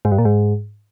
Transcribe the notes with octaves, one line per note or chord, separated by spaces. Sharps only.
G#2
G2
A#2
G#2